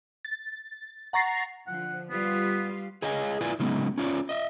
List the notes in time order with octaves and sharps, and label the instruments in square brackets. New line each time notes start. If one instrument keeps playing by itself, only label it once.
[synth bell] A6
F#5 A#5 C#6 A6 A#6 C7
[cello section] D3 F3 [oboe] F#5
[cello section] G3 F4 B4 [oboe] B3
[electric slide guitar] G#4 C#5 D#5 F5 G5 G#5
E4 F4 B4 D5 G#5
C#3 F#3 G#3 B3 C#4 D#4
C#4 F4 C#5 D5
D#5 E5